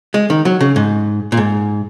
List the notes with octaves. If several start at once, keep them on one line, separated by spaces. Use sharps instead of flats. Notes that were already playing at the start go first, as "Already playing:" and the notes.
G#3
D#3
F#3
C#3
G#2
A#2
G#2